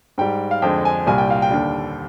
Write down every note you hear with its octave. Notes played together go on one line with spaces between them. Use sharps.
G#2 G3 G5
F5
F2 D3 G#3 G5
G#5
C2 A#2 G3 G#5
G5
F5
G5
D#2 D3 G3